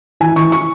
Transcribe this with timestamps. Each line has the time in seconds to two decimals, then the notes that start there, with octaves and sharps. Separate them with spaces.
0.20 E3 G#5
0.36 E3 C#6
0.52 C#6